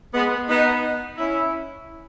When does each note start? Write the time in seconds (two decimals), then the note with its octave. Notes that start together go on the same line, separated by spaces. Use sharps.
0.14 G#3 B3
0.49 B3 D#4
1.18 C#4 E4